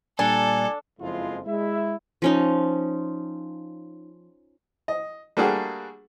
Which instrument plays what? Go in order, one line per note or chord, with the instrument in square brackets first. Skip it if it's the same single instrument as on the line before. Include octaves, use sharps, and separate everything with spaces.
[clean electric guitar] A#2 G3 [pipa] D4 [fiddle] A4 [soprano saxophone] G#5
[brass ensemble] F#1 F2 F3 G#3 E4 F4
G#3 E4 E5
[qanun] F3 C#4 D#4
[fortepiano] D#5
G3 A3 A#3 D4 F#4 G#4